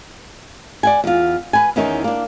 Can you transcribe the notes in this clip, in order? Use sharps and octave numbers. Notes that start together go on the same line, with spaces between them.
D5 F#5 G#5
E2 F4
B4 G#5
E2 D#3 E3 C#4 D#4
A#3 D4